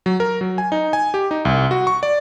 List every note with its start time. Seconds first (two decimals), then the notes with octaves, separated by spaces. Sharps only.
0.06 F#3
0.20 A#4
0.41 F#3
0.58 G#5
0.72 D#4
0.93 G#5
1.14 G4
1.31 D#4
1.45 C2
1.71 F#4
1.87 C#6
2.03 D5